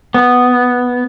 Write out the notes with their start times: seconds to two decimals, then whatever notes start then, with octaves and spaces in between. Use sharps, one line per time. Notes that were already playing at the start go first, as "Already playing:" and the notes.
0.14 B3